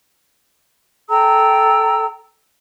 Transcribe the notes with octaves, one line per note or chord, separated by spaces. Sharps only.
A4 G5 A#5 E6